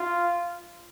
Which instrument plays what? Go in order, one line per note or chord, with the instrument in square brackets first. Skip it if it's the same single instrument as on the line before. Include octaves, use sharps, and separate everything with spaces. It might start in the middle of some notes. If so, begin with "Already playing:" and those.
Already playing: [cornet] F4